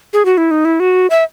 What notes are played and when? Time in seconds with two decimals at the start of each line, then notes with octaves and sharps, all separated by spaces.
0.13 G#4
0.25 F#4
0.38 E4
0.51 D#4
0.65 E4
0.80 F#4
1.10 E5